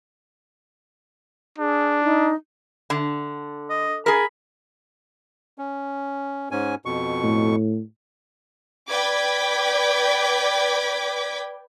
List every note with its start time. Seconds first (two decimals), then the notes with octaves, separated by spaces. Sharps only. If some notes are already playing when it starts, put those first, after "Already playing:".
1.58 D4 G#4
2.03 D#4
2.90 D3
3.70 D#5
4.06 G#4 A#4 B5
5.58 C#4
6.51 G#2 C#4 G#5
6.85 F2 B2 C#6
7.24 A2
8.89 B4 D5 G5 D6 G#6 B6